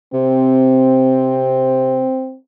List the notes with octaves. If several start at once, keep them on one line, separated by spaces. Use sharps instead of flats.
C3 C4